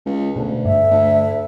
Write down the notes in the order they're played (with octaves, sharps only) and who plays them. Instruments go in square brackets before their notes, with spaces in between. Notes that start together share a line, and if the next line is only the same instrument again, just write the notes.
[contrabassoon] C#2
[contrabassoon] D2 [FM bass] B2
[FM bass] G2 [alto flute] E5
[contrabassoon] D2